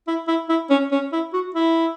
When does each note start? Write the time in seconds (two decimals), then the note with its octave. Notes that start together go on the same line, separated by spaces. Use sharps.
0.07 E4
0.28 E4
0.49 E4
0.70 C#4
0.92 C#4
1.13 E4
1.33 F#4
1.54 E4